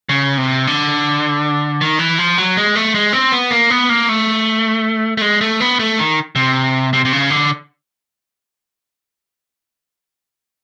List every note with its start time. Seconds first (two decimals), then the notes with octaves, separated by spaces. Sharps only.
0.09 C#3
0.38 C3
0.67 D3
1.81 D#3
1.99 E3
2.19 F3
2.38 F#3
2.57 G#3
2.75 A3
2.95 G#3
3.13 C4
3.32 B3
3.51 A#3
3.70 B3
3.89 A#3
4.09 A3
5.17 A3
5.22 G#3
5.41 A3
5.60 B3
5.79 A3
5.99 D#3
6.35 C3
6.93 C3
7.05 C3
7.13 C#3
7.30 D3